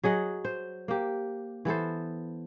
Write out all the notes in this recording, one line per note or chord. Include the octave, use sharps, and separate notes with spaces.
F#3 G#4 D#5 F#5
C5
A#3 G4
E3 B3 A4 C5